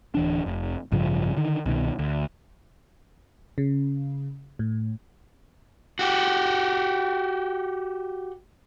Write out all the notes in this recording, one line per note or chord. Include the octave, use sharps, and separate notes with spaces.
D1 E3 D4
F1
A1 G2 C#3 F3
D3 D#3
C2 B2 D#3
D2
C#3
A2
F#4 G4